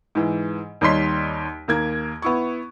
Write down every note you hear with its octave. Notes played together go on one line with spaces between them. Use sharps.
G#2 E3
D#2 G3 D#4 C#5 C6 B6
D#2 A#3 G#6
B3 E4 C#6